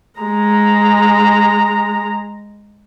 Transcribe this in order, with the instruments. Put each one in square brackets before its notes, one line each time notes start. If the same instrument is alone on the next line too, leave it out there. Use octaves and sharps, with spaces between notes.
[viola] G#3 A#5